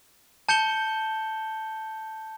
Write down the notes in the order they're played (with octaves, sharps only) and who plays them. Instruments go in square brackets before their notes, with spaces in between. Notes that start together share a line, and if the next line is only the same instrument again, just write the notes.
[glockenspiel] A5 G6 C#7 E7 G7